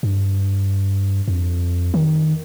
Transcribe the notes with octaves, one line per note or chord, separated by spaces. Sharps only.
G2
F2
D#3